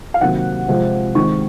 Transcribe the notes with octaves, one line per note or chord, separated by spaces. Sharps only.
F5
C3 D#3 F#3 A#3 F#5
C3 F3 G#3 C4
D#3 G#3 C4 C#6